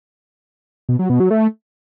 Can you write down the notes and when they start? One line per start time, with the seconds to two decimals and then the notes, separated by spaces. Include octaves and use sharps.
0.89 B2
0.99 F#3
1.10 B2
1.20 F#3
1.31 A3